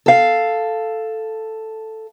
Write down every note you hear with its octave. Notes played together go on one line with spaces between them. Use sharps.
A4 F5